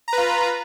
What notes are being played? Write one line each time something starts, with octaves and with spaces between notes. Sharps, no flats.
F4 B4 A#5